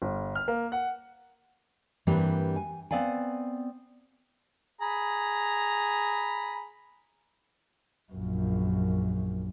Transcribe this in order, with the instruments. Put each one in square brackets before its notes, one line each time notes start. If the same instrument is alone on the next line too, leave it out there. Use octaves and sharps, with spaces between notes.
[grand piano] G1
F6
A#3
F#5
[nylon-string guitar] G2 E3 G3 A#3 C4 D4
G#5
B3 C4 D5 F5 G#5
[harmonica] G#4 A#5 B5
[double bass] A#1 F#2